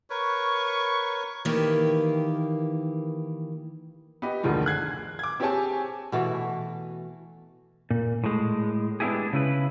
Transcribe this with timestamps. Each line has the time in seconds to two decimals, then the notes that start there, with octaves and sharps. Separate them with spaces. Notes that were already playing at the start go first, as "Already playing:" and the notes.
0.10 A#4 B4 C#5 C#6
1.45 D#3 E3 A#3 G4
4.22 B3 G4 D#5
4.43 F#1 D2 D3 D#3 F3 G#3
4.66 F#6 G#6 C7
5.19 D6 G#6
5.40 C4 G4 G#4 C#5 G#5 A5
6.12 B2 E3 A3 F#4
7.91 A#2
8.24 A2 G#3
9.00 G#3 B3 D4 E4 G4 G#4
9.33 C#3 E4 B4